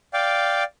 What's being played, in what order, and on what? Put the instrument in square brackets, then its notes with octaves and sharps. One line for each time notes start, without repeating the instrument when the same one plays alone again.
[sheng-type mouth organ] D5 F5 G5